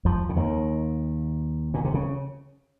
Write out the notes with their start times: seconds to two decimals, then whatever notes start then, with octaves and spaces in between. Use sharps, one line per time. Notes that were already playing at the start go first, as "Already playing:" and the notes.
0.05 F2 F3
0.29 C#3
0.36 D#2 D#3
1.74 A#2
1.85 C3
1.94 C#3